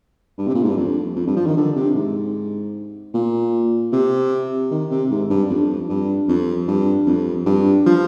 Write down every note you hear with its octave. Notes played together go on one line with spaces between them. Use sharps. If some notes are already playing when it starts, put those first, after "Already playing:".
G2
C3
A#2
G#2
G2
F2
F2
G2
F3
D#3
D3
C3
G#2
A#2
C3
D#3
C3
G#2
G2
F2
G2
F2
G2
F2
G2
F3